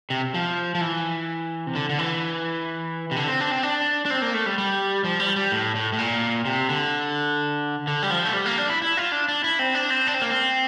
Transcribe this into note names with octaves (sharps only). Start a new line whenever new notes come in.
C3
F3
F3
E3
C3
D3
D3
E3
C3
D3
C4
D4
C4
D4
D4
C4
A#3
A3
G3
G3
F3
G3
G3
A2
A2
A2
A#2
C3
D3
D3
G3
F3
A3
G3
A#3
D4
E4
E4
F4
D4
D4
E4
C4
D4
C4
D4
C4
A#3
C4